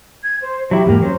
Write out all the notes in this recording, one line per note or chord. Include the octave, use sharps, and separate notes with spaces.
G#6
C5
F#3 E4 G4
E2 G#2 A#3 G4
F#3 C#4 C5